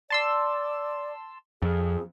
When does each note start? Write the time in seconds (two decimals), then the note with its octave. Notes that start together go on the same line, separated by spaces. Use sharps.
0.10 D5 A5 C6 E6
1.62 F2 G#4